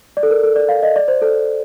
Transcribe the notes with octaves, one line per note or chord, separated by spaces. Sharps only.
D5
A4
A#4
A4
D5
F5
D#5
D5
C5
A4